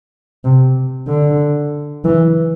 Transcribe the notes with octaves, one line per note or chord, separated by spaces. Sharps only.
C3
D3
E3